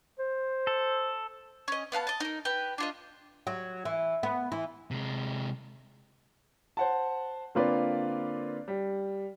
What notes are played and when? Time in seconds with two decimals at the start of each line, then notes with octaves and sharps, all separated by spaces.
0.19 C5
0.67 A4
1.68 C#4 D#5
1.92 B3 F5 F#5 A5
2.07 D#5 A5
2.20 D#4 A#4
2.45 G4 B4
2.78 D4 F4 D#5
3.47 F#3
3.85 E3
4.23 B3
4.52 E3
4.91 C3 G#3
6.77 C5 F#5 A5
7.55 D3 A#3 C4 F4 B4 D5
8.68 G3